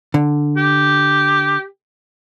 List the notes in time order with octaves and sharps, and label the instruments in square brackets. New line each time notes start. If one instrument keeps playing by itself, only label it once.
[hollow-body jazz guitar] D3
[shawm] G4